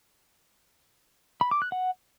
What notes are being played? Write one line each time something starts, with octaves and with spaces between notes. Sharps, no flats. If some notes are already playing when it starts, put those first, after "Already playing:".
B5
D6
F#6
F#5